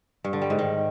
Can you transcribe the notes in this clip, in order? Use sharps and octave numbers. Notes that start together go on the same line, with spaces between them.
G2
D3
G3
G#2
D#3